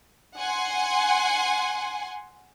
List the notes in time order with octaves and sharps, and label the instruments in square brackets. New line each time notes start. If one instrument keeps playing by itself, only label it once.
[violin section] F#5 G#5 C6